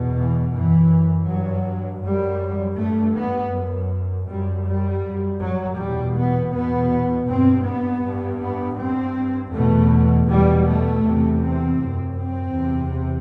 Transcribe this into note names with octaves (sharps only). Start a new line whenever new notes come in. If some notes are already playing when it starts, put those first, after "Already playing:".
Already playing: E2 B2
E3
F#2 E3
G2 F#3
F#2 G3
G2 A3
B3
F#2
F#2 G3
G3
F#2
F#3
E2 B2 G3
B3
E2 B2 B3
G2 C4
B3
G2
B3
G2 C4
E2 B2 A3
E2 B2 G3
A3
E2 C3
C4
F#2
C4
E2 C3